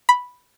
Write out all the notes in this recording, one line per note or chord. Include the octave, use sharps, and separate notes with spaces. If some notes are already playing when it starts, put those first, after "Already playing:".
B5